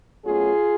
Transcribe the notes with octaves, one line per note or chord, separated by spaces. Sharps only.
B2 F#3 A3 C#4 F4 G#4